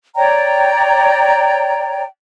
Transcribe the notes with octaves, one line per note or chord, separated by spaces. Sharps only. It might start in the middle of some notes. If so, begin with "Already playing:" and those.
C#5 D5 G5 A#5